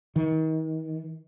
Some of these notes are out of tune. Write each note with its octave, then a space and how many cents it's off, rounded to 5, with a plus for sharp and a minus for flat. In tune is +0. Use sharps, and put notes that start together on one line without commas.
D#3 +35